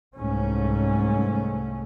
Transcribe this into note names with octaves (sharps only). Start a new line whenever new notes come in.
C2 G#2 A3 C#4